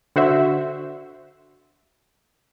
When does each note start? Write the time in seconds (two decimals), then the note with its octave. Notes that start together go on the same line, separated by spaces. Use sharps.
0.16 D3 F#4 C5 E5